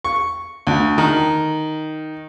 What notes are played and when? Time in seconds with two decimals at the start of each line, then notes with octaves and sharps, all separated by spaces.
0.05 C#6
0.67 D2
0.98 D#3